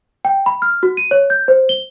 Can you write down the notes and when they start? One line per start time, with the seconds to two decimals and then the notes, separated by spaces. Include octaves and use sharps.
0.25 G5
0.46 B5
0.62 F6
0.83 F#4
0.97 D#7
1.11 C#5
1.30 G6
1.48 C5
1.69 G7